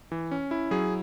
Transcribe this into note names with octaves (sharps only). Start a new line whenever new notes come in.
E3
C#4
E4
F#3 G#4